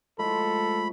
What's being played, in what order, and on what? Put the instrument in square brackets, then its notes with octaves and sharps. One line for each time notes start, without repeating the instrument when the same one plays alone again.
[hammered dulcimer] F3 G#3 A3 [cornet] A4 [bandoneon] B5